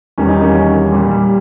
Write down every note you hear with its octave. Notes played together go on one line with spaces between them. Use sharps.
E2 D#3 G3 C#4
D#4
A#3 C#4
A#2 G3
G3